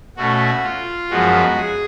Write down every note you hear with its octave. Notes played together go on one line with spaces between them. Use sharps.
B2 A3 C#4 F#4
F4
F#2 F3 G#3 B3 F#4
G#4